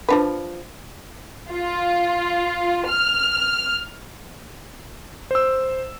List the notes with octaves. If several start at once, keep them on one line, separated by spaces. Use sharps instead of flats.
F3 D4 B4
F4
F6
C5 E6